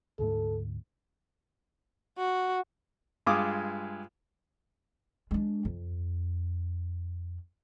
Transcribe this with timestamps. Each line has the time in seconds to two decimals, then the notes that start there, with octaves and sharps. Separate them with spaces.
0.19 D2 G#2 A3 A4
2.18 F#4
3.27 G2 G#3 F4 G#5 D6 D#6
5.31 G#3 D4
5.65 F2